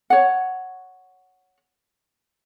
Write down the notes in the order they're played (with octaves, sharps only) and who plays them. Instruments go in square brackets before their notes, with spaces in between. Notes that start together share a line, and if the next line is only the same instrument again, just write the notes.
[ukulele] C#5 F#5